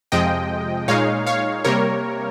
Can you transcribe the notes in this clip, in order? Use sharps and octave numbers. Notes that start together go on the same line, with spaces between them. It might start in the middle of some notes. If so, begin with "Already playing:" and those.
F2 C3 F3 G#3 D#5 G5
A#2 G#3 D#4 C#5 F5
C#5 F5
C3 G3 A#3 A#4 C#5